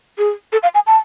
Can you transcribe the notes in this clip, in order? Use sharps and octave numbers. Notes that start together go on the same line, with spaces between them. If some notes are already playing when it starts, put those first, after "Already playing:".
G#4
A4
F5
G#5
A5